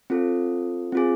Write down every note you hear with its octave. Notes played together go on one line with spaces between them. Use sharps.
C4 F4 A4
C4 F4 G#4